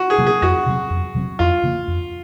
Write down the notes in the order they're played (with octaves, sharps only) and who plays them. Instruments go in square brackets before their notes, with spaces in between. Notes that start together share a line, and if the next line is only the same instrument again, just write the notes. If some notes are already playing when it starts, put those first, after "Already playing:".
Already playing: [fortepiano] F#4
G#4
[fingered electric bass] C3 F#3 A#3
[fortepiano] G#4
[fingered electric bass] F2 [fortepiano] F#4
[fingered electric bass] C3 F#3 C4
F2
C3 F#3 C4
[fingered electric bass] F2 [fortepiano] F4
[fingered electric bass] C#3 F3 A#3
F2